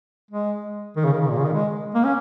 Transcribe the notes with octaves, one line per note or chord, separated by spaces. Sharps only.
G#3
D#3
C#3
D#3
C#3
A#2
C#3
D#3
G#3
A#3
C#4